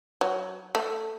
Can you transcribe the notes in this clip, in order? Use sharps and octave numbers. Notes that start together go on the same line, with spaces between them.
F#3
A3